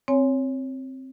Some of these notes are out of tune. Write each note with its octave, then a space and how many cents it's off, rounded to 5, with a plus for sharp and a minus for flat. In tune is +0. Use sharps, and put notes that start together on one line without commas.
C4 +10 C#5 +5 G#5 +0